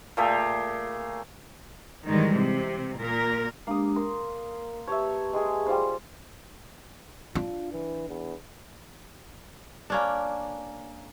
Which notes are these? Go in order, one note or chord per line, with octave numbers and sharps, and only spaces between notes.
A#2 A3 G4 G#4
G#2 D#3 E3 G3 G#3
C3
A#2 A#4
G#3 A#3 D4 G4 D#6
A#4 C6
G4 B4 C#5 E5 A5
G#3 G#4
G3 F4 C5
D4 F4
E3
E2
A#3 C#4 D4